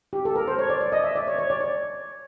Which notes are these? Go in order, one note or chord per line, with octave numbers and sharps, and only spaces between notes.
G4
A4
A#4
C5
C#5
D5
D5
D#5
E5
D5
C#5
C#5
D5
C#5